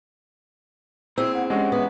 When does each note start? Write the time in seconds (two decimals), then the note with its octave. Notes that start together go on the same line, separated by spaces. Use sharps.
1.18 A#3 C4 E4 G#4 E6
1.34 F#5
1.50 G#3 C#4 D4 G4 D#5 F#5
1.72 E2 B3